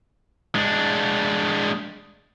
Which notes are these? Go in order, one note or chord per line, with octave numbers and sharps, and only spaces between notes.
G#3 D4